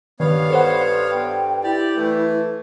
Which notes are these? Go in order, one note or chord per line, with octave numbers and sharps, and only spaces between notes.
G2 D#3 B3 C#5 F5
A4 C5 F#5
G5
E4 G4 D5
E3 A3